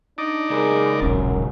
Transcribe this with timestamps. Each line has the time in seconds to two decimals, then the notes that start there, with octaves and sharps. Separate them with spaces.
0.18 D4 D#4 D5
0.50 C#2 G#4 A#4
1.02 D#1 B1 F#2 C#4